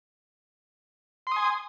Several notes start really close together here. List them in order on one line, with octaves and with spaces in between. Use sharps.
C6 D#6 G#5